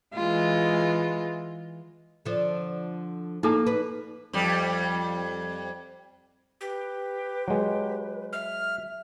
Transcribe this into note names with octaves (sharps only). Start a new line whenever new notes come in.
E3 G#3 F4
D3 F3
A#3 D#4 A4 A5
B4
F2 G3
G4 B4
F#3 G#3
E5 F6